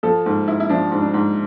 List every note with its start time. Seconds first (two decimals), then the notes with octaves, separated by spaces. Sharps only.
0.03 F3 A4
0.26 G#2
0.48 G#2 E4
0.60 E4
0.69 F3 D4
0.91 G#2
1.02 D4
1.14 G#2